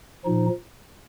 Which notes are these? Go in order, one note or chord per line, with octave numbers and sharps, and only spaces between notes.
A#2 F3 D#4